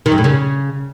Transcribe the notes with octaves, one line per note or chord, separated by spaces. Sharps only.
D#3
F#2
A2
C#3